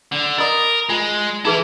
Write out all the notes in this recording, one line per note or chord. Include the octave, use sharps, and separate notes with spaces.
D3
A#4 D#5 B5 D#6
G#3 F4 G#5
E3 D#4 E4 G#4 B4